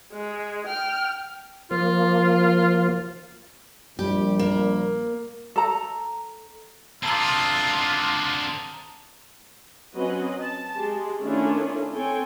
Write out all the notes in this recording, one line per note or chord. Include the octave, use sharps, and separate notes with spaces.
G#3
G5 F6
F3 A#3 F4
A#1 G3 G4
A#3
A4 A#5
D3 C4 F4 A5 A#5 D#6
F#3 C4 C#4 B4 D#5
A5
G#3 G4
D#3 A3 C#4 D4 E4 F4
C4 A4 C#5 G5 G#5